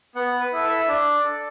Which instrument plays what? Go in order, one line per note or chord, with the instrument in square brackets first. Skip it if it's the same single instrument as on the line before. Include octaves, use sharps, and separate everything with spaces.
[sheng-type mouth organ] B3 F#5
B4
E4 A4
E5
D4 D5
A4